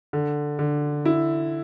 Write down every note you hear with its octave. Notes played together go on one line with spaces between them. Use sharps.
D3
D3
E4